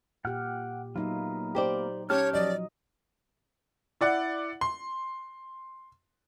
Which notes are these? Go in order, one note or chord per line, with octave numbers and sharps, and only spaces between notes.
A#2 G4 F#5 G5 F6
F#3 A#3 B3 D#4 F4 E5
G4 C5 D5
C#4 G4 C#5 A5 F6 G6
F3 F#3 D5 D#5
E4 D5 F#5
C6